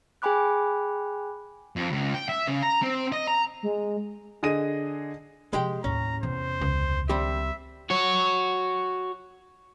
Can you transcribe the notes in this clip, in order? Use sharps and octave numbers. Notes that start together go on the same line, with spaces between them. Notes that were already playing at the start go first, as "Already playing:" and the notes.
G#4 G5 G#5 B5 D6 F#6
F2
C#2
G5
E5
C#3
A#5
C4
D#5
A#5
G#3
D3 G#4 D#5 A#6 D#7
C3 F3 G#3 G4 G5
D#2 A2 C#4 A#5
E2 C3 C5
C#2
D#3 G3 C4 D4 G4 E5
F#4 C#5